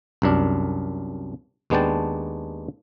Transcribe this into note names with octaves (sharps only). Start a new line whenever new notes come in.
C2 F#2 D4
D#2 G#3 B3 D4 G5 A5